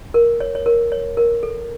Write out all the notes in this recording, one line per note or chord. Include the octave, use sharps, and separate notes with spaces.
A#4
C#5
C#5
A#4
C#5
A#4
A4